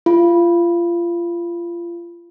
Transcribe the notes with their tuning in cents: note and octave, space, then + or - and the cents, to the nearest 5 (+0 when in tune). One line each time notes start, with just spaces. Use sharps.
F4 -25